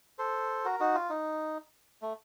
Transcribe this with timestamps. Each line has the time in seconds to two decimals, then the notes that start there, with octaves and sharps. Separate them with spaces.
0.18 A4 C5
0.65 F#4 A#4
0.80 D#4 F#4
0.95 F4
1.10 D#4
2.02 A3